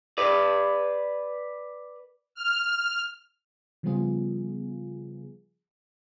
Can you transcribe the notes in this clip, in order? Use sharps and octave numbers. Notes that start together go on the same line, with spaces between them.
B4 D5
F6
C#3 F3 G3 B3 F4 G#4